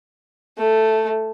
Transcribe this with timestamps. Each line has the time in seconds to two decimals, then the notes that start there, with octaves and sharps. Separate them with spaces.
0.58 A3